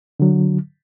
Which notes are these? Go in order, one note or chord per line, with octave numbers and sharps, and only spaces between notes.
D3 F#3